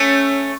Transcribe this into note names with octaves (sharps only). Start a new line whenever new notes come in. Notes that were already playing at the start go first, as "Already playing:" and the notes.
Already playing: A3 C#4